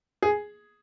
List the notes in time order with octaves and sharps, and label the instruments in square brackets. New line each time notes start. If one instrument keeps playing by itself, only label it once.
[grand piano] G#4